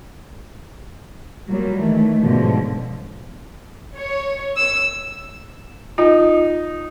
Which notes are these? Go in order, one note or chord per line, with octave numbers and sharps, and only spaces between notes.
A#2 F#3 G3
D#3 E3 A3
G#2 B2 D3 F3 F#3
C#5
E6
D#4 F4